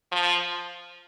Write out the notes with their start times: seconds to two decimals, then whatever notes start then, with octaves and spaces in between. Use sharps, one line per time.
0.12 F3